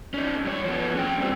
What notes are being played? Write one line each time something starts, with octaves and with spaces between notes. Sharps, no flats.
C#4 D#4
G2 C#5
F3 B3
C#4 G5
G2 C4